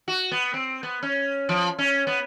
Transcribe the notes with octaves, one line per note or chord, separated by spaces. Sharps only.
F#4
B3
C4
B3
C#4
F3
C#4
B3